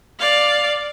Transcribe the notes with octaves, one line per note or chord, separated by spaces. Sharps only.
D5 F5